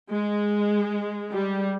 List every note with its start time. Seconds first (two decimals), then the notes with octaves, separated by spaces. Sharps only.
0.10 G#3
1.33 G3